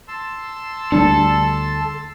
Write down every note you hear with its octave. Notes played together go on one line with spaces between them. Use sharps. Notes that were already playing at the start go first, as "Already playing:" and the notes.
A5 C6 E6
D2 G3 D4 A4